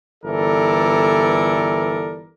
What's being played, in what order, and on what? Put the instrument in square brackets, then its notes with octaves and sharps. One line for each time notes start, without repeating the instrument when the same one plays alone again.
[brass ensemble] G1 E3 A4 A#4 D5